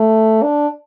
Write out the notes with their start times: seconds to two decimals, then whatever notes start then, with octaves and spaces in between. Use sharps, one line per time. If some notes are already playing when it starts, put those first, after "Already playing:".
Already playing: A3
0.43 D4